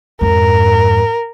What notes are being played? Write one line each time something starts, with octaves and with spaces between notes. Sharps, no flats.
F2 G#2 A#4